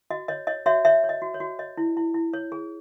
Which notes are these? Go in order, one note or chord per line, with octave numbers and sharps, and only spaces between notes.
F#4 D#5
C#5 D#5
C#5 D#5
F#4 C#5 E5
C#5 E5
C#5
D#5
F#4
C#5
F#4
C#5 D#5
E4
E4
E4
C#5
G#4